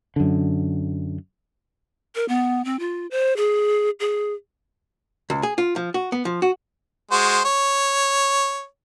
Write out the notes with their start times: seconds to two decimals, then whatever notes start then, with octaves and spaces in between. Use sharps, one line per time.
0.16 F#2 D3
2.15 A#4
2.28 B3
2.65 C4
2.79 F4
3.11 C5
3.37 G#4
4.00 G#4
5.30 C#2
5.43 G#4
5.58 F4
5.76 F3
5.94 F#4
6.12 B3
6.25 F3
6.42 F#4
7.11 G#3 F#4 C5
7.45 C#5